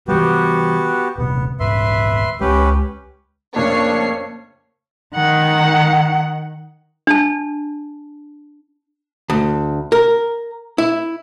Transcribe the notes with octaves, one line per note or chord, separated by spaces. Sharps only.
E3 G3 B3 F#4 G4
D#1 C3 B3
D#1 G#2 B4 E5 C6
C#2 G#3 C#4 G4 B4
F2 A2 C#3 A#3 D4 C#5 C7
D#3 F#5
D4 A5
D2
A#4
E4